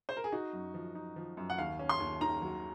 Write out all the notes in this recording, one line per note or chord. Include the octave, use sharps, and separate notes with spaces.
C5
A#4
G#4
D#4 F#4
F#2
F3
D#4
F3
F#2
F#5
D#2 F5
C#4
C6
D#2
D#3 A#5
F#3